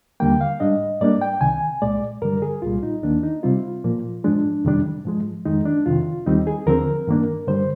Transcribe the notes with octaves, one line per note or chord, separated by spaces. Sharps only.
D#2 D3 G3 A#3 G5
F5
G#2 G3 D4 D#5
G#2 G3 A#3 D4 D5
G5
C2 C3 D#3 G#5
C2 A#2 G#3 D5
G2 D3 G3 A#4
G#4
C2 A#2 G3 F4
D#4
D#2 D#3 A#3 D4
D#4
C3 G3 C4 F4
A#2 F3 A#3
G#2 F3 G#3 D4
F2 C3 D#3 G3 D4
G#2 F3 G#3
F2 D#3 G#3 D#4
D4
F2 C3 D#3 F4
D#2 D#3 G3 C4 D#4
G#4
D#2 D3 F3 C4 A#4
G2 D#3 A#3 D4
G2 D3 G3 C5